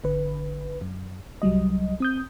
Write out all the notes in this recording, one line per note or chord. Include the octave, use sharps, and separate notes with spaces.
G#1 D3 B4
F#2
C2 F#3 G3 D#5
C4 D#6 G6